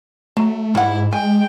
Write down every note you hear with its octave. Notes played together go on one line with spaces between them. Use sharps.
F#3 A3
G#2 G3 E4 F#5
G#3 G5 G#5